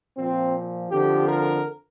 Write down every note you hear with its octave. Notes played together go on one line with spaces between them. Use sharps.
A#2 F3 C4
F2 D3 F3 G4
A#4